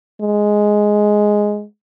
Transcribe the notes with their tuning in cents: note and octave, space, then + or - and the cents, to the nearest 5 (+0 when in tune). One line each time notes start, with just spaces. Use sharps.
G#3 +5